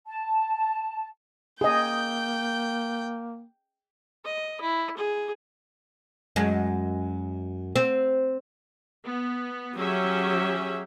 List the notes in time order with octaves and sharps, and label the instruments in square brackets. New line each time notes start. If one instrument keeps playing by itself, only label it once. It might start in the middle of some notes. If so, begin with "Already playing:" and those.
[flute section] A5
[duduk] A#3 [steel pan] G#4 D#5 [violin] G5 G6
[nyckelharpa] D#5
E4
G#4
[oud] F#2 G#3
C4
[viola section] B3
[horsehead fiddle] F#3 G4 [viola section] C#4 G#4 E5